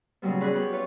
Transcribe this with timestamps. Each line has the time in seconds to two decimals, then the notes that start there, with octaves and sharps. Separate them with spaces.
0.22 A#2 C#3 F#3 G3 B3
0.40 C#4 G#4 D5 B5 C#6 F#6
0.54 B3 G4
0.72 F4 B4 C#5